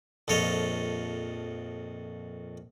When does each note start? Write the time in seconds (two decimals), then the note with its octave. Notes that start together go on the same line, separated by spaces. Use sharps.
0.28 A#1 F2 A4 C#5 D#5